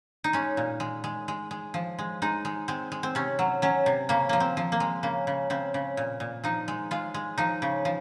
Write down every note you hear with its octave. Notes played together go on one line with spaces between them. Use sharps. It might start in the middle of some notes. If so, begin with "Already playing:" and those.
D#4
G#3 C#4
A#2
G#3
G#3
G#3
G#3
F3
G#3
G#3 D#4
G#3
G#3 C4
G#3
C4
C3 C#4
F#3
F#3 C#4
C3
C#3 A#3
F3 A#3
C4
F3
A#3
G#3
C#3 A#3
C#3
C#3 C4
C#3
A#2
A#2
F3 D#4
G#3
G#3 F4
G#3
F3 D#4
C#3
F3